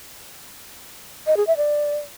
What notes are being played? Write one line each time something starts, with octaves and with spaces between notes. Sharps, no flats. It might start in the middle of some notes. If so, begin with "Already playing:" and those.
D#5
G#4
E5
D5